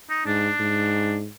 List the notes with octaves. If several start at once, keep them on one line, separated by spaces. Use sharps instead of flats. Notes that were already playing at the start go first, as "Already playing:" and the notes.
D#4
G#2 D4
G#2